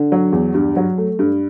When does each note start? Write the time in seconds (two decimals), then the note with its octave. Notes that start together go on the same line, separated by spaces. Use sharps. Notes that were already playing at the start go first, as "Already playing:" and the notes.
Already playing: D3
0.12 F#3
0.32 E2
0.54 G2
0.76 F#3
0.98 A3
1.19 G2